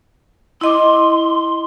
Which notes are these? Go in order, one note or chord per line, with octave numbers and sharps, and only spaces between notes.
E4 D#5 C6 D6